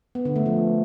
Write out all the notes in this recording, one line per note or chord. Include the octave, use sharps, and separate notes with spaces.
B3
D3
A3
F3